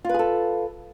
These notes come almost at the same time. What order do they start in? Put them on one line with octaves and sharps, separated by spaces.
F4 B4 G#4 A4